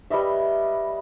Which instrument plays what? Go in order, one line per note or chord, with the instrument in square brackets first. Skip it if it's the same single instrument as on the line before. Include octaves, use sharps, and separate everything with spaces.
[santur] G3 B4 D#5 E5